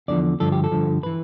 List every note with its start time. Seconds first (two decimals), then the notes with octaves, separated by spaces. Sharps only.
0.08 E2 D3 F3 D5
0.40 G2 D3 F3 A4
0.52 G4
0.64 A4
0.72 G2 D3 F3
1.03 E3 B4